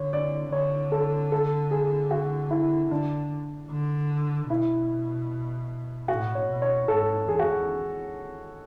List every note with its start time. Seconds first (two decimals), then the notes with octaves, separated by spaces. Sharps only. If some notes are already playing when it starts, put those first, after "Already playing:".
Already playing: D3 C#5
0.13 D5
0.52 D3 C#5
0.92 A4
1.32 A4
1.71 G#4
2.11 F#4
2.50 E4
2.91 D3 D4
3.70 D3
4.50 B2 E4
6.08 A2 F#4
6.35 C#5
6.48 B2
6.62 C#5
6.88 G#2 A4
7.28 E2 G#4
7.39 F#4